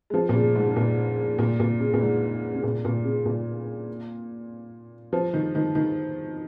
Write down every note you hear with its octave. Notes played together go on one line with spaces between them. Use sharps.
G#3
F3
A#2
C#3
G#2
C#3
A#2
A#2
A#2
C#3
A#2
G#2
C#3
A#2
A#2
C#3
A#2
F3
D#3
D#3
D#3